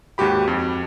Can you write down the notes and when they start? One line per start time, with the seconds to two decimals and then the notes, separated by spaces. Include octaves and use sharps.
0.18 D#2 G#2 F#4 G4 B5
0.47 F2